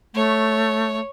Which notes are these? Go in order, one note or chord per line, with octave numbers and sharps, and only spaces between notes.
A3 C#5